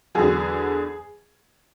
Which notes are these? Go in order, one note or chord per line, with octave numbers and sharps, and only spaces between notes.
E2 D3 F#3 G#4